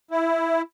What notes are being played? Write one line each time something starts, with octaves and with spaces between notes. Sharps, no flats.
E4